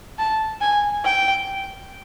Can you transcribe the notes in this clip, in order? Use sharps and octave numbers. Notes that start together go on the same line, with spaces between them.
A5
G#5
G5